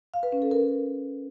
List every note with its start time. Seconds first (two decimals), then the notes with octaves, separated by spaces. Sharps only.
0.14 F5
0.23 B4
0.32 C#4
0.42 A4
0.51 A#4